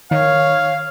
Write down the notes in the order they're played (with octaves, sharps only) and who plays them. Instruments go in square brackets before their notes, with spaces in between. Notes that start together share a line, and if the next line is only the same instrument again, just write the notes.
[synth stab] D#3 [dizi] C#5 [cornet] F5